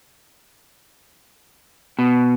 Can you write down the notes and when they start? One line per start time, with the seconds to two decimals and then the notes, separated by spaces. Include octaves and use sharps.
1.99 B2